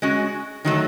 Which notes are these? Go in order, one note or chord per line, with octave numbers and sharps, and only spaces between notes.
G#3 C#4 F#4
D#3 F#3 A3